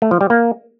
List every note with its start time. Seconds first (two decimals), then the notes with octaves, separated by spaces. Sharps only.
0.02 A3
0.11 F3
0.21 G3
0.30 A#3